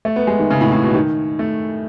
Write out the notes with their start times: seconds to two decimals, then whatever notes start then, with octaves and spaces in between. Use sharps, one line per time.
0.05 A3
0.16 B3
0.27 G#3
0.39 D#3
0.50 C#3
0.61 A2
0.72 A2
0.83 B2
0.94 D#3
1.39 A3